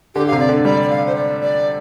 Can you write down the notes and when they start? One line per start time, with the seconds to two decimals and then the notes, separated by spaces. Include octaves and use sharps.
0.15 D3 G4
0.27 F5
0.32 C3
0.40 D5
0.49 D3
0.65 G3 D5
0.82 D5
0.90 F5
1.06 C5
1.16 D5
1.41 D5